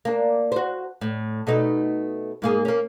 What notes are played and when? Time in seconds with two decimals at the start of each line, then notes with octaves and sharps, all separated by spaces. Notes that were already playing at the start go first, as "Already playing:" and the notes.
0.05 A#3 D4
0.52 F#4 C5
1.01 A2
1.47 B2 A3 D#4
2.42 G#2 A#3 G#4
2.65 A#3 C#4